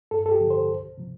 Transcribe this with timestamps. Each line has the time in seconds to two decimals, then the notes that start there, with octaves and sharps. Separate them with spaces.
0.11 G2 A4
0.26 A4
0.31 G4
0.41 D3 F3
0.50 C5
0.69 C2
0.98 C3 F3